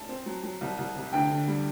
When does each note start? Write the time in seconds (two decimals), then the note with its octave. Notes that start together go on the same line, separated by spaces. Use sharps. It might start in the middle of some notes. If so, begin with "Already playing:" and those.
Already playing: A5
0.09 C4
0.26 F#3
0.43 F#3
0.61 C2
0.78 C2
0.96 C3
1.13 D2 G5
1.30 D3
1.48 G3